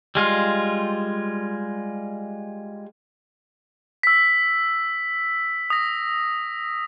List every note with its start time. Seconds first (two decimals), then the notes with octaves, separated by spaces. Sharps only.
0.15 G3 G#3 F4
4.03 E6 B6
5.70 D#6 A#6